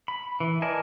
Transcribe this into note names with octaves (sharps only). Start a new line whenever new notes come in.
B5
E3
A#4 D5 D#5 G#5 A5